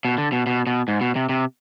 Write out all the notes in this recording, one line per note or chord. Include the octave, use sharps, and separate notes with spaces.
B2
D3
B2
B2
B2
G#2
B2
C3
C3